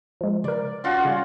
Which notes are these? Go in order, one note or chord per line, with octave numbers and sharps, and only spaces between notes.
F3 G#3
C#3 A#4 D5
C#4 F4 F#4
C#3 G3